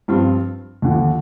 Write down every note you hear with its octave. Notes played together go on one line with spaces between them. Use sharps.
G2 F3 C4 F4
D#2 D3 F3